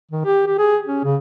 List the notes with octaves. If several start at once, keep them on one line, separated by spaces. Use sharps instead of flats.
D#3
G4
G4
G#4
C#4
C#3